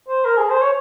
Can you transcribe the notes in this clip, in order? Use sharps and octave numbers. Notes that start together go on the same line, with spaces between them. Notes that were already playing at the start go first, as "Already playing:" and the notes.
C5
A#4
G#4
C5
C#5